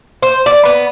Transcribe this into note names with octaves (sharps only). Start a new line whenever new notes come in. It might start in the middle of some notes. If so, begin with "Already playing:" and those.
C5
D5
B3